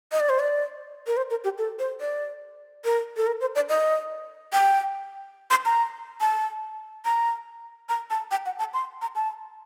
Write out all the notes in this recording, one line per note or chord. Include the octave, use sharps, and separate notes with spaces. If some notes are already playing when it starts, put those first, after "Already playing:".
D#5
D5
C5
D5
A#4
C5
A#4
G4
A4
C5
D5
A#4
A4
A#4
C5
D5
D#5
G5
C6
A#5
A5
A#5
A#5
A5
G5
F#5
A5
C6
A#5
A5